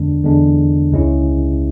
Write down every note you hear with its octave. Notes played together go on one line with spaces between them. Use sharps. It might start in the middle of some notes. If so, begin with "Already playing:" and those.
Already playing: E2 D3 G#3 D4
E2 D3 G#3 D4
C#2 C#3 G#3 C#4 E4